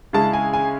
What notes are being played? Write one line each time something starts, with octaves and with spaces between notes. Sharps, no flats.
C#3 G#3 C#4 E4 A5
G#5
G#5